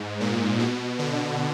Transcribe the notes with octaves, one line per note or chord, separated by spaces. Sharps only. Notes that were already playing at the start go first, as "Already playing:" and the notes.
Already playing: G#2
A#2
B2
D3